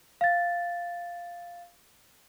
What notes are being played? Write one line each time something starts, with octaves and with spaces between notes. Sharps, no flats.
F5 A6